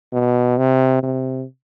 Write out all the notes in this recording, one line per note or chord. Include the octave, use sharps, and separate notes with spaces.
B2
C3
C3